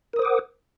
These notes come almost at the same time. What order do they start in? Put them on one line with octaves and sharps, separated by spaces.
A#4 D#6 C5 D6 F#5